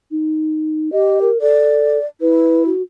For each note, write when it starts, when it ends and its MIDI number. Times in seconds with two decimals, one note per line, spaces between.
0.11 0.90 63
0.92 1.30 67
0.92 1.19 75
1.21 1.38 70
1.41 1.98 69
1.41 2.05 74
2.21 2.71 64
2.21 2.62 71
2.65 2.82 66